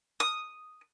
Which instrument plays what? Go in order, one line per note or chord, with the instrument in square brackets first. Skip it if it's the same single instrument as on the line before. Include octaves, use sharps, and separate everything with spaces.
[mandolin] D#6